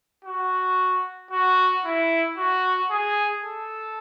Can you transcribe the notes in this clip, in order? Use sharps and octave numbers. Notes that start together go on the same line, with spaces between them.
F#4
F#4
E4
F#4
G#4
A4